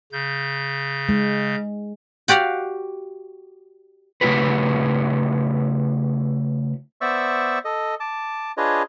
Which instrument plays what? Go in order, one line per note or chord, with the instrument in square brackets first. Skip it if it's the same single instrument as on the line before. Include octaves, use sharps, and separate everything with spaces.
[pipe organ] C#3 G6
[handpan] G#3
[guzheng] F#4 G4 D5 F5 F#5
[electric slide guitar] C#3 A3 E4 F#4 G4 B4
[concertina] B3 C5 D5 E5 C#6 E6
A4 D#5
A5 D6
D4 F4 G#4 B4 C#5 D#5